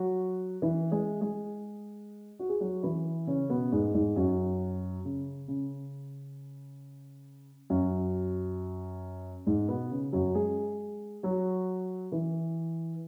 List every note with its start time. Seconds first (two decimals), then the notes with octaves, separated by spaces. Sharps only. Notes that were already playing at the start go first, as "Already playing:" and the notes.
Already playing: F#3 F#4
0.62 E3 E4
0.91 G#3 G#4
1.21 G#3 G#4
2.39 F#4
2.49 G#4
2.60 F#3 F#4
2.83 E3 E4
3.27 C#3 C#4
3.50 B2 B3
3.72 G#2 G#3
3.94 G#2 G#3
4.16 F#2 F#3
5.05 C#3
5.48 C#3
7.70 F#2 F#3
9.46 G#2 G#3
9.68 B2 B3
9.91 C#3
10.12 F#2 F#3
10.35 G#3 G#4
11.23 F#3 F#4
12.12 E3 E4